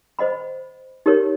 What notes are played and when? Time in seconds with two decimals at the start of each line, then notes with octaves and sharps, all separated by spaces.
0.19 C5 D#5 F#5 B5
1.06 D#4 G4 A#4 C#5